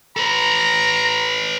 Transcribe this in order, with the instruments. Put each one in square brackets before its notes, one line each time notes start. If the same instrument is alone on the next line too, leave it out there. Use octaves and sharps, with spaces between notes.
[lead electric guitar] A4 B4 [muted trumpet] A#5